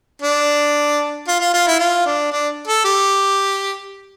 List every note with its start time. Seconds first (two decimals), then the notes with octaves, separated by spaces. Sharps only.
0.22 D4
1.28 F4
1.40 F4
1.54 F4
1.67 E4
1.79 F4
2.06 D4
2.32 D4
2.68 A4
2.85 G4